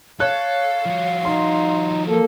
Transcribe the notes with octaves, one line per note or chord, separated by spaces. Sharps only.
A4 C#5 F5 F#6
F3 F#4
D#4 C6
A#3 A4